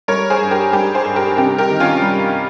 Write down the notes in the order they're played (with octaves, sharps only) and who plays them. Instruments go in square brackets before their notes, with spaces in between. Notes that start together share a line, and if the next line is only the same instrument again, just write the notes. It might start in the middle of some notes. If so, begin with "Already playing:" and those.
[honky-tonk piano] G3 A#4 C#5
G#4 C5
G2
G4 A#4
G3 G4 A#4
G#4 C5
G2
G4 A#4
C3 G4 A#4
G4 A#4
D#3
C#4 F4
G3